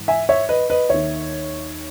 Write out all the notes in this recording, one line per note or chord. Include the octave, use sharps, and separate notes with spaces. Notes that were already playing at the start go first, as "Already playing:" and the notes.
Already playing: G#2 E3
E5 G#5
C#5 E5
B4 D#5
B4 D#5
D#2 D#3 C#5 E5